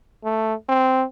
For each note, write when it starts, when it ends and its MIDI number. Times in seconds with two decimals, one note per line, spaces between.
0.24 0.54 57
0.69 1.04 60